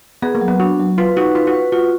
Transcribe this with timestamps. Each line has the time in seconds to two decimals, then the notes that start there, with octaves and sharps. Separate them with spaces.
0.22 B3 G#4
0.35 A#3
0.41 F#3
0.48 B3
0.60 D4 F#4
0.79 F#3
0.98 F4 B4
1.16 D#4 F#4
1.35 F4 B4
1.47 F#4
1.54 B4
1.72 F4 F#4